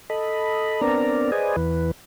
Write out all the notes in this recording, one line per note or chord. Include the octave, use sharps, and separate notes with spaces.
A4 D#5 B5
B3 C4 D4 A#4 D5 A#5
G#4 B4 C5 D5 D#5 G#5
E2 E3 B4